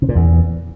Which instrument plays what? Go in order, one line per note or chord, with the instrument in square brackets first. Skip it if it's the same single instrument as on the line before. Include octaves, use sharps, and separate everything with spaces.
[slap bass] C3
A#2
E2